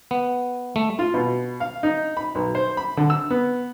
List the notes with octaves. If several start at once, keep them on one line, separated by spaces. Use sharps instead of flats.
B3
A3
F4
B2
F5
D#4
B5
B1
C5
B5
D3
E6
B3